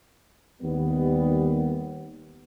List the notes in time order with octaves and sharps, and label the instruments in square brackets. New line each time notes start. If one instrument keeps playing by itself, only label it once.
[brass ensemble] D#2 G3 B3